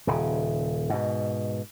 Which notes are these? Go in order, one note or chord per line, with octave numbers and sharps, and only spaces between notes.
D#1 C#3
G#2 B2